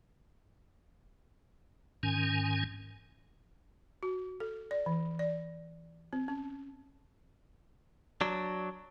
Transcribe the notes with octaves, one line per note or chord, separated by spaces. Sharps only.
G#2 D#3 C#4 G#5
F#4
A4
D5
E3
D5
C4
C#4
F#3 D4